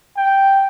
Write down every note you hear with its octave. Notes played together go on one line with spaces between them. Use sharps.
G5